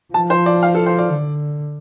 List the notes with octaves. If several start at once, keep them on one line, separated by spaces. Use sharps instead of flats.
F3 A5
C5
D5
F5
A4
C5
D5
D3